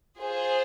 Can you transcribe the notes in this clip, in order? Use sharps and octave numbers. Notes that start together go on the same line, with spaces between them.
F4 G#4 C5